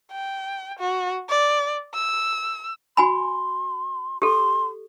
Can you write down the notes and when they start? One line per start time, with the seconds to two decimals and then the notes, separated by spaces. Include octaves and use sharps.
0.12 G5
0.79 F#4
1.29 D5
1.95 E6
2.97 F#4 G#5 B5 C6
4.22 G4 A4 C6